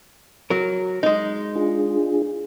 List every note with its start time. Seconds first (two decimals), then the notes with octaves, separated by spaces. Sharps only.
0.50 F#3 A#4
1.03 G#3 D#4
1.56 D4 F4 G#4